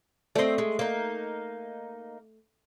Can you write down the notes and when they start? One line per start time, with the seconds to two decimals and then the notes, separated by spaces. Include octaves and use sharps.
0.35 A3 C4 D5 D#5
0.58 G#3
0.79 A#3 D#4